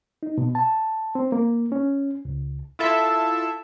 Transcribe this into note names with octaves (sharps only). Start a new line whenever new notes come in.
D#4
B2
A5
C4
A#3
C#4
C#2
E4 F4 A4 E5